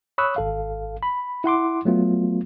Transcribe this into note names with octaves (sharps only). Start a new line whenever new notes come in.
C#5 B5 C#6 D#6 E6 F#6
G#1 A4 F5
B5
E4 F#5 C6 D6
F#3 A3 B3 F4